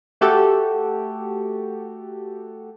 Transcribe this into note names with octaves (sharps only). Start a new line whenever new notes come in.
A3 F#4 G4 A4